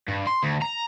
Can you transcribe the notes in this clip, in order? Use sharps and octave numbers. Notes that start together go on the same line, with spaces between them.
G2
C6
D2
A#5